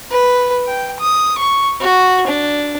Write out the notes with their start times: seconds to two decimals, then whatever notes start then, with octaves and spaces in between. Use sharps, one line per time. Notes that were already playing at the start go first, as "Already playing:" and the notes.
0.11 B4
0.67 G5
1.00 D#6
1.38 C#6
1.81 F#4
2.27 D4